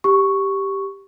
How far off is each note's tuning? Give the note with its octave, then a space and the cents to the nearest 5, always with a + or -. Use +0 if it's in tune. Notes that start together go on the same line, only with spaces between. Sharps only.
G4 +0 C#6 +0